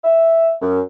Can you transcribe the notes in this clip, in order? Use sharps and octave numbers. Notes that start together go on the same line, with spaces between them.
E5
F#2